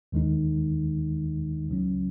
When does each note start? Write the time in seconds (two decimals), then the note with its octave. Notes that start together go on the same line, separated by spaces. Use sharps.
0.12 D#2 D#3 G#3 D#4
1.68 C#2 C#3 F#3 C#4